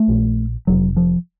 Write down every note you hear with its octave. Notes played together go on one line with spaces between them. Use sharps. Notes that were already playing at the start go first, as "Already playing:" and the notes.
Already playing: A3
A#1 A#2
F1 F2 C3 F#3
F3